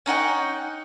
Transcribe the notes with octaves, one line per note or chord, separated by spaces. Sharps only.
C#4 D#4 F#5 G5